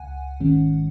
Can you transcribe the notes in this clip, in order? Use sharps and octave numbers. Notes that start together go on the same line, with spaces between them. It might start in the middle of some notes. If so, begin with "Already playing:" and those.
Already playing: C#2 F#5 G#5
G#1 G#2 D#3 G#3 C#4